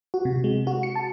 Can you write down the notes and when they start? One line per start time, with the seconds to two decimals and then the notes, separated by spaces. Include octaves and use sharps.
0.14 F#4
0.25 C3
0.44 G#3
0.67 F#4
0.83 C#7
0.95 A5